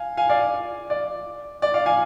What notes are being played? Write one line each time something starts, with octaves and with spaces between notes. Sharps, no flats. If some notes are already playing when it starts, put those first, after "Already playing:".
Already playing: F5 G#5
F5 G#5
D5 F5
D5
D5
D5 F5
F5 G#5